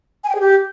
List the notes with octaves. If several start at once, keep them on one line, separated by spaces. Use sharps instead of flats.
G#5
G5
G#4
G4